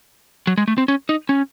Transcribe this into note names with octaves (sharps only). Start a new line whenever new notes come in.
F#3
G#3
A3
C4
C#4
D#4
C#4